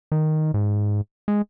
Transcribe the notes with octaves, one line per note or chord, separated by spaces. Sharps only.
D#3
G#2
G#3